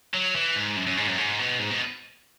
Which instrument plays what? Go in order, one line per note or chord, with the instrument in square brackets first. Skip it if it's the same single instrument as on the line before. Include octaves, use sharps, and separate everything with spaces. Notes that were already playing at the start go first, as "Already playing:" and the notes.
[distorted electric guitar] F#3
E3
G#2
F#2
F#2
G#2
F#2
G#2
B2
G#2
B2